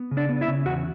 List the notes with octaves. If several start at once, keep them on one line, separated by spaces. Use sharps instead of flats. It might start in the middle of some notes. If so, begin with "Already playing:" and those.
Already playing: B3
C#3
D4 D5
B3
E4 E5
C#3
E2 F#4 F#5